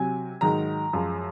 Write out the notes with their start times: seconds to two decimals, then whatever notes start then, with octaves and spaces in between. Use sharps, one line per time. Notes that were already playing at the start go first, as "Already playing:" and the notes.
Already playing: C3 F#3 G#5
0.41 G#2 D#3 F#3 A#5
0.93 F#2 F3 G#3